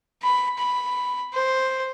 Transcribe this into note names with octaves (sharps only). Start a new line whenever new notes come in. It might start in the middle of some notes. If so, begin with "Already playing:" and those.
B5
B5
C5